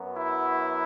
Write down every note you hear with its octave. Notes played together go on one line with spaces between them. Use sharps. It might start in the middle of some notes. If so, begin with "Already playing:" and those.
Already playing: F#2 F#3 B3
E4